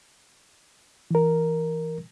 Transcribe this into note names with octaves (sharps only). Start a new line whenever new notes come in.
E3 A#4